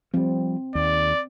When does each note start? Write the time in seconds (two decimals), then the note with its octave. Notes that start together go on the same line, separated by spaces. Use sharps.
0.14 F3 G3 C4
0.75 D#2 D5